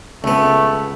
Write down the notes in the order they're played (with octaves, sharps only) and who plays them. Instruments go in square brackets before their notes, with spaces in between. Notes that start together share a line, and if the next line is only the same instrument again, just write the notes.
[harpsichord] C#2 B3 [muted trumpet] A3